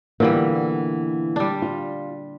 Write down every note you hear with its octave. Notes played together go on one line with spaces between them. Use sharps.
A#2 D3 E3 G3 A#3 B3
G3 D4
F4